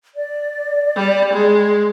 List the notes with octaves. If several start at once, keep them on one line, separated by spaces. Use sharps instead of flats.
D5
G3
G#3